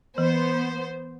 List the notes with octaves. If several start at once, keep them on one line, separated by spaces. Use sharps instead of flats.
E3 B3 C5